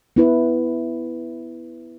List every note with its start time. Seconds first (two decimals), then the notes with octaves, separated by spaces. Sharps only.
0.16 B3 E4 B4